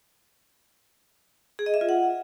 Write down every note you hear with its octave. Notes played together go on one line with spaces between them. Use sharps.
G#4
D#5
E5
F4
F#5